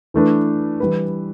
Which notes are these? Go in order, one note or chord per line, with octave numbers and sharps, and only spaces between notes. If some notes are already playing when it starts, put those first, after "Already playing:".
E3 A3 D4 B4
E3 G3 E4 B4